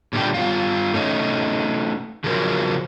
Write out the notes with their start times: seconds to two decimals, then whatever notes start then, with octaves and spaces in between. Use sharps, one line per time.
0.13 A#2 D3 G3 B3 D4 G4
0.34 G2 F4
0.94 A3 C#4 D#4
2.24 C#3 F3 F#3 E4 A#4 C5